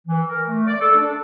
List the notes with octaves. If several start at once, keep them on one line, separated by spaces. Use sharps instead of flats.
E3
A#4
A3
D5
A4
D4